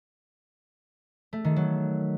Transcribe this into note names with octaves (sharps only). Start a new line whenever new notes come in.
A3
D#3
F#3